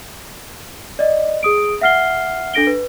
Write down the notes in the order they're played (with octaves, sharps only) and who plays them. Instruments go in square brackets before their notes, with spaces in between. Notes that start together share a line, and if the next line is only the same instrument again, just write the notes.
[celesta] D5 D#5
G#4 D#6 D7
E5 F#5 F6 C7 G7
D4 A4 A#6 D7 G7
B4